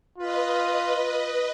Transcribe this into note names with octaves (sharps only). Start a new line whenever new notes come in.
F4 B4 D#5